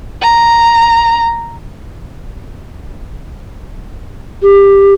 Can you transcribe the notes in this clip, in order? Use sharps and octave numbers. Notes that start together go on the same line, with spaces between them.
A#5
G4